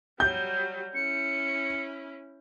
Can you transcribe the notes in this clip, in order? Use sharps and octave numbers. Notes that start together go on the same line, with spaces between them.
F#3 G3 G6
C#4 E4 C#7